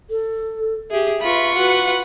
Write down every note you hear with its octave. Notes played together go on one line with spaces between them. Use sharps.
A4
G4 G#4 E5
F4 B4 B5 C#6
F#4 B4 F#5